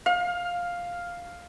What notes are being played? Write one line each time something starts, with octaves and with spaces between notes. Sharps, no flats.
F5